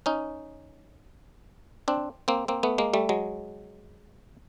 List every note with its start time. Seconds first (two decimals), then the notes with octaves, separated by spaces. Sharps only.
0.06 C#4 D#4
1.88 C4 D4
2.28 A#3 C4
2.48 A#3 C4
2.63 A3 B3
2.78 G#3 A#3
2.94 G3 A3
3.09 F#3 G#3